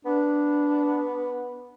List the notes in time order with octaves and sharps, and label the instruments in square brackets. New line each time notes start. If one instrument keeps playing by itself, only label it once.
[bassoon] B3 [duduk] D4